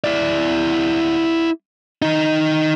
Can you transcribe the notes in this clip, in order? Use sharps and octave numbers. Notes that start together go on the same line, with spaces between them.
E4 D5
D#3 D#4